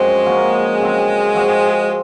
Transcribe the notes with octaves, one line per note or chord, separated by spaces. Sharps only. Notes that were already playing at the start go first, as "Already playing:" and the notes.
Already playing: F#2 F3 G#3 C4 F#4
F3 A#3 C#4 F#4
C#3 F#3 C4
F3 C4 F#4